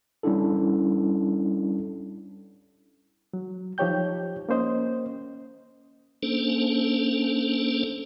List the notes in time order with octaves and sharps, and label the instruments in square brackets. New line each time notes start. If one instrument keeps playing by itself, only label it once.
[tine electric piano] G3 C#4 D4 E4 A4
[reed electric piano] F#3
F3 D#4 G4 C#5 G5 G6
A#3 C#4 C5 D#5
[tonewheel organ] A#3 C#4 D4 A4 C5